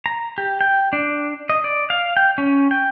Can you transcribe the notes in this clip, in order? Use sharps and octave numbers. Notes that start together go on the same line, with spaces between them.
A#5
G4
G5
D4
D#5
D5
F5
G5
C#4
G5